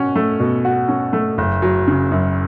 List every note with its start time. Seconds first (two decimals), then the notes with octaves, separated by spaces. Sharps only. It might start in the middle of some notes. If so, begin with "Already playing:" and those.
Already playing: B2 C#4 F#4
0.16 A3
0.40 B2
0.65 F#4
0.88 C#4
1.13 A3
1.38 F#1
1.62 F#3
1.88 C#3
2.11 F#2